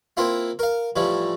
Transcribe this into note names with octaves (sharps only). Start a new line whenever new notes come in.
A#3 C4 E4 F4
A#4 F5
A2 E3 F3 G3